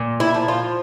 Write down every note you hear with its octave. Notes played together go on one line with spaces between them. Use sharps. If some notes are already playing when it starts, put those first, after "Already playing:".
Already playing: A#2
E4
F3
F4